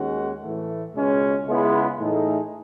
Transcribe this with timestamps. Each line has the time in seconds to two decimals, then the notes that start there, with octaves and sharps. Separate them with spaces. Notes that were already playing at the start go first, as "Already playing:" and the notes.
Already playing: D#2 D#3 G#3 C#4 F#4
0.42 A2 E3 A3
0.95 C#2 B2 G#3 C#4
1.46 C#2 C#3 G#3 B3 E4
1.98 A2 E3 A3 D#4 G#4